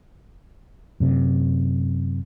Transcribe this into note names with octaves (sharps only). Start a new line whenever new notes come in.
F#2 C3